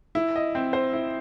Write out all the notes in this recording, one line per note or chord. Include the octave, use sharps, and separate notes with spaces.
E4
D#5
C4
C5
E4